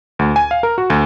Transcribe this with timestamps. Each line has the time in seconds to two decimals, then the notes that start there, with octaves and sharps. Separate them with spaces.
0.19 D2
0.36 G#5
0.51 F5
0.63 A#4
0.78 F#4
0.90 D2